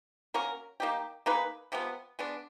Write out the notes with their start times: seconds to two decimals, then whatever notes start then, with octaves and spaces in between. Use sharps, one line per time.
0.34 A#3 C#4 F#4 A#4
0.80 A#3 D#4 G4
1.26 A#3 D#4 G#4 B4
1.72 C3 F3 G#3 B3
2.19 G#3 B3 D4